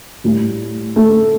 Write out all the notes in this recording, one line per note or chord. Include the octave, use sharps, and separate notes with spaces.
A2 G3
A3